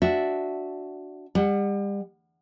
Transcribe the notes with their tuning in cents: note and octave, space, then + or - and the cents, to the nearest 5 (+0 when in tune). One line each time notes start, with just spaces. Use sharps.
D4 +0 F#4 +0 E5 -5
G3 +35 F#5 +0